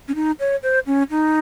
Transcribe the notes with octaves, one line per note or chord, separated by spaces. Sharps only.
C#4
D#4
C#5
C5
C#4
D#4